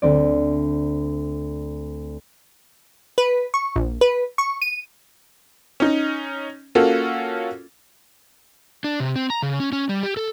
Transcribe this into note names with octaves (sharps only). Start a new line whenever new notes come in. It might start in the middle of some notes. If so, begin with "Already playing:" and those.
D2 C4 D5
B4
C#6
A#1
B4
C#6
D#7
C#4 D#4
A#3 C#4 F4 F#4 A4
D4
C3
C4
A#5
C#3
C#4
C#4
G3
G4
A4